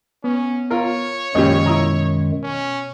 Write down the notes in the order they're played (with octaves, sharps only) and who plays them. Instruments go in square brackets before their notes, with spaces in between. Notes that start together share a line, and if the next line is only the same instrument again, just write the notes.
[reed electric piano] B3 [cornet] C#4
[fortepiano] F4 A#4 [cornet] C#5
[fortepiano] A#1 C#4 G4 [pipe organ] F#2 D#3 G#3 [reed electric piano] D#5
[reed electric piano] B2 [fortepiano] E4 D#5 A#5
[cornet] C#4